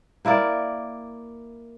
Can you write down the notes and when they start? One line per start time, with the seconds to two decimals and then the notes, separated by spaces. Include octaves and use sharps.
0.25 A#3 E4 A#4 D5